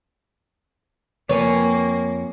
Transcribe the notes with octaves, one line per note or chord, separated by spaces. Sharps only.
F2 A#3 B4 C#5 G#5